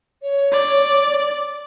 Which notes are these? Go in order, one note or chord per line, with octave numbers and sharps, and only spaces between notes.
C#5
D5